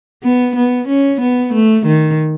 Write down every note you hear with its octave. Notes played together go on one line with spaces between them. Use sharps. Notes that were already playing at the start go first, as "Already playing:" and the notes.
B3
B3
C#4
B3
A3
D#3